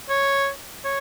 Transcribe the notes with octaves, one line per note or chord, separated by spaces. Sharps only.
C#5
C#5